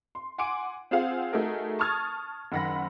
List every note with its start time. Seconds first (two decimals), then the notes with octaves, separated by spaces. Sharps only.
0.15 C6
0.38 F#5 G#5 C6 D6 D7
0.91 C4 F4 G#4 C5 F5 F#5
1.33 A3 D#4 F#4 G#4 A#4
1.79 A5 C#6 D#6 F6 G#6 A6
2.52 F#1 D#3 F#5 B5 A#6